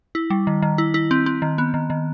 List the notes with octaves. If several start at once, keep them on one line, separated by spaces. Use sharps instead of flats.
E4
G3
D#3
D#3
E4
E4
C4
C4
D#3
B3
D#3
D#3